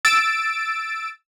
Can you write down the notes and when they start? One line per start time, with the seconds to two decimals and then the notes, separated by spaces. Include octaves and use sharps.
0.05 E6 A6 D7